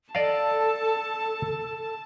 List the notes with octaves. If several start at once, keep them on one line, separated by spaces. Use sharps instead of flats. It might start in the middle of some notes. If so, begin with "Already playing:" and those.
A4 D5 D#5 F5 A5